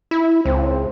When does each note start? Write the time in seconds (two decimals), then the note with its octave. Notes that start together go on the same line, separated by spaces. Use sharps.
0.11 E4
0.45 C#2 C4